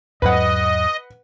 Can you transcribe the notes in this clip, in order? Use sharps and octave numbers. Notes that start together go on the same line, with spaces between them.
E2 G#2 F#3 B4 D#5 F#5